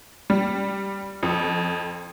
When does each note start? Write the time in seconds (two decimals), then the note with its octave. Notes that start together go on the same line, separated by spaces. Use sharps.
0.30 G3
1.23 F2